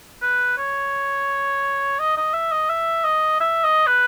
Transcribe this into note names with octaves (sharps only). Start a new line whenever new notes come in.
B4
C#5
D#5
D#5
E5
D#5
E5
D#5
E5
D#5
B4